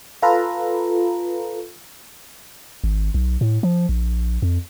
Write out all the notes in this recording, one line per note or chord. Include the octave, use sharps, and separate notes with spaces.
F4 A4 B4 A#5
G#1
B1
A2
F3
A#1
F2